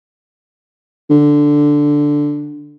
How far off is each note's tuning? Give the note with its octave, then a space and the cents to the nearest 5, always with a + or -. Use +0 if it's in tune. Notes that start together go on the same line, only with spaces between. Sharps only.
D3 +0